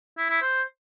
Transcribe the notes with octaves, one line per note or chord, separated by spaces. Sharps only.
E4
E4
C5